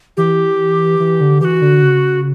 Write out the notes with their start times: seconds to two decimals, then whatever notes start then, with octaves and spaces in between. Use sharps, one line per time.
0.17 E3 G4
1.00 E3
1.21 D3
1.41 E3 F#4 G4
1.62 D3
1.83 C#3